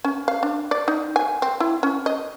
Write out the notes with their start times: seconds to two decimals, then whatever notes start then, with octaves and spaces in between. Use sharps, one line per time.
0.04 C#4
0.28 F5
0.43 D4
0.71 D5
0.88 D#4
1.16 G#5
1.42 C4
1.60 E4
1.83 C#4
2.06 D#5